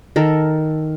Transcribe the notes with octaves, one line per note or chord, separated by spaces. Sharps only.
D#3 A4 A#4